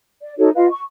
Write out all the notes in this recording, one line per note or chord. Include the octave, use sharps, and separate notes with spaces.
D5
D#4 F#4 A4 C#5
F4 B4 D#5 F5
C#6